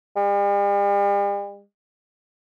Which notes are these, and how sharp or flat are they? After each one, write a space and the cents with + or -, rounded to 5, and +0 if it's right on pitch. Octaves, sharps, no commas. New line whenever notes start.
G3 +45